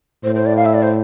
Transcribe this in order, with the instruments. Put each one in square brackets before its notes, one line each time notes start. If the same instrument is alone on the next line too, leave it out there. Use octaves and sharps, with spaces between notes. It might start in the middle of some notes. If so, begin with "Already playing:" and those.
[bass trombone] A2 [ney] C5
[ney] C5
D5
F5
E5
D5
C5